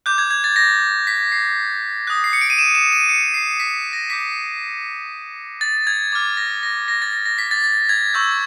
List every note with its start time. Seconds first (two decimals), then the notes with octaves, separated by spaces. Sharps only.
0.06 D6 F#6 G6
0.18 G#6
0.31 G#6
0.44 A6
0.56 A#6
1.07 B6
1.32 C7
2.07 D#6 F#6
2.24 C7
2.33 C#7
2.41 D7
2.50 D#7
2.59 E7
2.75 E7
2.92 D#7
3.09 C#7
3.34 C7
3.60 B6
3.93 A#6
4.10 D6 G6 B6
5.61 A6
5.87 G#6
6.12 D6 F6 A6
6.37 A#6
6.63 A#6
6.88 A#6
7.02 A6
7.13 A#6
7.26 A#6
7.38 B6
7.51 A6
7.64 A6
7.89 G#6
8.14 C#6 E6 G6 G#6